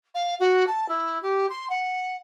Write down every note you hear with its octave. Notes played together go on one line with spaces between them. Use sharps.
F5
F#4
A5
E4
G4
C6
F#5